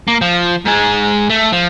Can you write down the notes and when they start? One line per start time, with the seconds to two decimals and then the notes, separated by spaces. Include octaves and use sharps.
0.08 A#3
0.21 F3
0.66 G#2 G#3
1.30 A3
1.53 F3